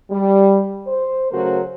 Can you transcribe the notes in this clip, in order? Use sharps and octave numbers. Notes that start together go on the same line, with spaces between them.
G3
C5
C#3 F#3 A3 F#4 A#4 C5